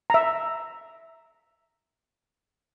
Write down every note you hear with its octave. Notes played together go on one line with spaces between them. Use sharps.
E5 A#5